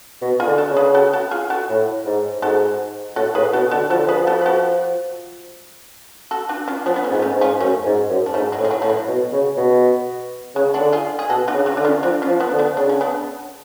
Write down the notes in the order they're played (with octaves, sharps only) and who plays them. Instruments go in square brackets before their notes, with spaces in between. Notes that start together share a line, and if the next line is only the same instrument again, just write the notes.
[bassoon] B2
[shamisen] F4 G#4
[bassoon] D3
[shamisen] F#4 A4
[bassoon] C#3
[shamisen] G#4 B4
F#4 A4
F#4 A4
F4 G#4
F#4 A4
[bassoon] A2
G#2
[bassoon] G#2 [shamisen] F#4 A4
[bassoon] A2 [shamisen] F#4 A4
[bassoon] A2 [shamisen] G#4 B4
[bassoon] B2 [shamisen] F#4 A4
[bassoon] D3 [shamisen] F#4 A4
[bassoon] F3 [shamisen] F#4 A4
[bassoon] D3
[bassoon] F3 [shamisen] G#4 B4
[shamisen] F#4 A4
B4
F#4 A4
F#4 A4
D4 F#4
C#4 F4
[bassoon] F3 [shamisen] B3 D4
[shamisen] B3
A3 C#4
[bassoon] G#2
[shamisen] B3
A3 C#4
[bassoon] G#2
[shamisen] C#4 F4
[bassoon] F#2 [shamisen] A3 C#4
[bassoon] G#2
F#2
[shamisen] D4
[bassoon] G#2 [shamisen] A3 C#4
[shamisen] F#3
[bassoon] A2
[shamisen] G#3
F#3
[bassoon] A2 [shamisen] F3
[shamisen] F#3
[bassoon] B2
C#3
B2
[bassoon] C#3 [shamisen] G#3
[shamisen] D4 F#4
[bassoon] D3
[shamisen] F4 G#4
G#4
[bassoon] B2 [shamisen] F#4 A4
[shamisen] D4 F#4
[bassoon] C#3
[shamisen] D4 F#4
[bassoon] D3 [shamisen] D4
[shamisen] C#4 F4
[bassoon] F3 [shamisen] D4 F#4
[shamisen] C#4 F4
[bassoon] F3
[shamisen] B3 D4
[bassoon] D3
[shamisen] B3 D4
[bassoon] C#3 [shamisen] D4
[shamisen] C#4
B3 D4